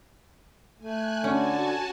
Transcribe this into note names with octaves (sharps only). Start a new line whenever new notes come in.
A3 G#5 F#6
D3 C#4 F#4 G#5 A5